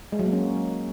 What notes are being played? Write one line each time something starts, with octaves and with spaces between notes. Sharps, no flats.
G#3
F#3
A#3
C#4